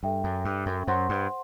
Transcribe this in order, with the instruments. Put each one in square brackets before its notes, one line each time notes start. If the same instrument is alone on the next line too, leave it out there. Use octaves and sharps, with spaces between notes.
[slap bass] G2 [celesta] A4 E5 G5
[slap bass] F#2
G2
F#2
[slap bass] F#2 [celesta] C5 F#5 C6
[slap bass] G2